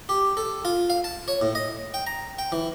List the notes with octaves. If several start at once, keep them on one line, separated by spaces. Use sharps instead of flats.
G4
A4
F4
F5
A5
C#5
A2
D#5
G5
A#5
G5
E3